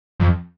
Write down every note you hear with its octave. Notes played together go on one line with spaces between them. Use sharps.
F2